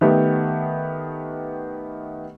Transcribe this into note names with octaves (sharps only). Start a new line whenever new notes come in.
D#3 A3 B3 G4